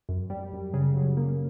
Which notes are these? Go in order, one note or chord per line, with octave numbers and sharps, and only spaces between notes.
F#2
G3
F#2
C#3
F#3
A#3